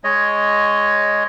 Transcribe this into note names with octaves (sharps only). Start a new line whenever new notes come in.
G#3 C#5 D#5